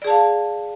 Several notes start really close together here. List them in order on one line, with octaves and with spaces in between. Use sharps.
D5 G#4 A5 F5